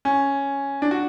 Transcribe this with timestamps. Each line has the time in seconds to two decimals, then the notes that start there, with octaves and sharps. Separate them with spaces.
0.05 C#4
0.82 D4
0.91 F#4